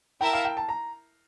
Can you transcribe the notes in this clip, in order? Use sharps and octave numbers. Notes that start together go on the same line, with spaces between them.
E4 A#4 E5 G5 A5
F5
G5
A5
A#5